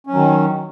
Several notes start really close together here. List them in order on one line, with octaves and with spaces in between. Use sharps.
C#4 F#3 D#3